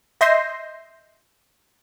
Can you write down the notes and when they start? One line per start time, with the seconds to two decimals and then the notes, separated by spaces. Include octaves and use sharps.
0.21 D#5 E5 C6 G6 A#6 C7